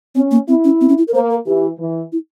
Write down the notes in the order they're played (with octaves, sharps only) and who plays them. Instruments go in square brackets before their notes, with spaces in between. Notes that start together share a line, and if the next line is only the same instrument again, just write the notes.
[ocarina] C4 [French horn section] C#4
[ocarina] A#3
[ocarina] C4 [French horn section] E4
[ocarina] C#4
C4
C#4
E4
A#4
[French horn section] A#3 [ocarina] C5
[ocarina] A#4
[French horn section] E3 [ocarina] G4
[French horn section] E3
[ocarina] E4